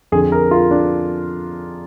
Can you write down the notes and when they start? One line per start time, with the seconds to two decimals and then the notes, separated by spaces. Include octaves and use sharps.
0.12 F2 D3 G#4
0.32 A#4
0.51 F4
0.71 D4